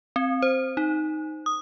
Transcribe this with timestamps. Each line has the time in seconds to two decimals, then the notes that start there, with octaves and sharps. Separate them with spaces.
0.16 C4
0.42 C5
0.77 D#4
1.46 D#6